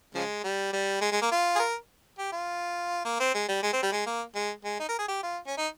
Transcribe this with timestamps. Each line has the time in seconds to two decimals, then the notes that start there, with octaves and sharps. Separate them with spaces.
0.15 C#3 F3 G#3
0.44 G3
0.73 G3
1.01 G#3
1.12 G#3
1.22 A#3
1.31 F4
1.56 G#4
1.60 A#4
2.18 G4
2.32 F4
3.05 A#3
3.20 C4
3.34 G#3
3.49 G3
3.63 G#3
3.73 C4
3.83 G3
3.92 G#3
4.06 A#3
4.35 G#3
4.64 G#3
4.80 D#4
4.89 A#4
4.99 G#4
5.08 G4
5.23 F4
5.47 C#4
5.57 D#4